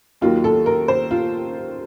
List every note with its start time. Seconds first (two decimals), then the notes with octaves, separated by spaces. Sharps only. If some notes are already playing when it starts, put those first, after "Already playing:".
0.21 D#2 D#3 F#3 A#3 F4
0.44 A4
0.66 A#4
0.88 C5
1.11 F4